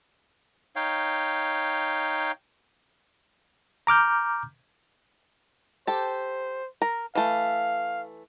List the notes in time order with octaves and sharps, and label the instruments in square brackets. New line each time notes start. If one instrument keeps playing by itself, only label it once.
[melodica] D#4 C#5 F5 G5
[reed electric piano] A#5 D6 F6 G6
[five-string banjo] G4 A4 [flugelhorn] C5
[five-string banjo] A#4
[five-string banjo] E3 A3 [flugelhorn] F5